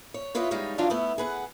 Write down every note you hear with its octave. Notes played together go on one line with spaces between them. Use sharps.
C#5
E4 F4 B4 C#5 D#5
G3 G#3 D#4 C#5 F5
D#3 E3 F#3 D4 F4 F5
A3 B3 E4
G#4 B4 F#5